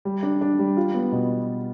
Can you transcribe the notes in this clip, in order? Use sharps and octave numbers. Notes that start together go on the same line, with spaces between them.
G3
D4
D4
G3
F4
B3
B2